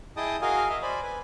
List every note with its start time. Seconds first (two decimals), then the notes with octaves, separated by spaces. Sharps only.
0.17 E4 G#4 D#5 G5 A5 D#6
0.42 F#4 G#4 A#4 D#5 F5 G#5
0.69 D#5 E5
0.82 C5 D5 G#5 B5
1.03 B4 G#5